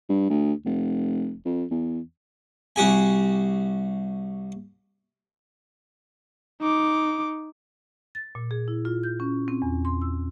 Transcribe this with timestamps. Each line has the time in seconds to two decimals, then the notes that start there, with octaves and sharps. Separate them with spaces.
0.09 G2
0.30 D2
0.66 F1
1.45 F2
1.71 E2
2.76 C2 F#4 G4 G#5
6.61 D#4 D6
8.15 A6
8.35 A#2
8.51 G#4
8.68 E4
8.85 F4
9.03 G6
9.20 C#4
9.48 C4
9.62 E2
9.85 C6
10.02 E6